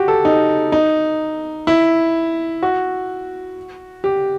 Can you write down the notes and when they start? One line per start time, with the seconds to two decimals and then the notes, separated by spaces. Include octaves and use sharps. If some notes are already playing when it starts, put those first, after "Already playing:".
Already playing: F#4 G4
0.08 A4
0.25 D#4
0.72 D#4
1.67 E4
2.63 F#4
4.04 G4